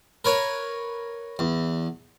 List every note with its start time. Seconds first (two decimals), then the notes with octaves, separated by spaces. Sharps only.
0.25 A#4 B4 C#5
1.39 E2